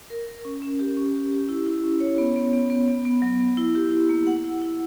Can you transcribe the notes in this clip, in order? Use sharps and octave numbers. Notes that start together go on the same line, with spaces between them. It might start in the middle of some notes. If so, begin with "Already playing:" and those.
A#4
A#4
C#4
C#4
G4
C#4
G4
G4
E4
E4
C#4
C#5
B3
B3
B3
B3
B3
B3
F#3
B3
E4
G4
E4
A#3
F#5
E4
E4